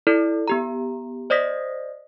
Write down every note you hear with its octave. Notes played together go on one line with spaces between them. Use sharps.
E4 A4 D5
B3 G4 A#5
C5 D5 D#5 D#6 A#6 B6